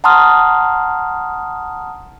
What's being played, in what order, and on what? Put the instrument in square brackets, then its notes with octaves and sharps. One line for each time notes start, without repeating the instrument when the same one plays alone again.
[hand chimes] F#5 A5 A#5 C6 D#6 F6